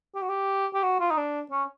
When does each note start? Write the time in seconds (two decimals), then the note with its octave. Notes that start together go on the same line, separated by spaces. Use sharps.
0.15 G4
0.22 F#4
0.29 G4
0.74 G4
0.83 F#4
1.00 F4
1.11 D#4
1.17 D4
1.51 C#4